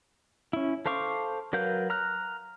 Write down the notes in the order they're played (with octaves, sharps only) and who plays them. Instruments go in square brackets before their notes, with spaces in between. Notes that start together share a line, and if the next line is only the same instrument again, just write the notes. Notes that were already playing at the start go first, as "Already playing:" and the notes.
[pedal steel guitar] C#4 E4
A4 C5 F5 C#6 D6
F#3 A#4 B4 F5 G6
A#5 F6 F#6